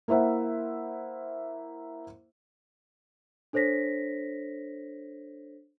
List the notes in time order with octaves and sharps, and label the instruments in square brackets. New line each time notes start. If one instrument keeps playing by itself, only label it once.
[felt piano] A#3 E4 C5 E5 F#5
[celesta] D4 A4 C5 C#5 A#6 B6